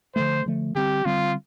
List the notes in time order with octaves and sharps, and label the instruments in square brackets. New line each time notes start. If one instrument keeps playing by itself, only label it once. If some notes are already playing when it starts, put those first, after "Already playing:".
[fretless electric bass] D3 F3 A3 [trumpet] C5
[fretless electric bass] D3 F3 A3
[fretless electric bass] D3 G3 C4 [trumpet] G4
[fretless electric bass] D3 G3 C4 [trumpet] F4